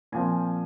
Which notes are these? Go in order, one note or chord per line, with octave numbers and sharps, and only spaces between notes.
A#2 F3 C4 G#5